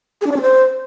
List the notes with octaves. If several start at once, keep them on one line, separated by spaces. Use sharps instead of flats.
G#4
D4
D5
C#4
C5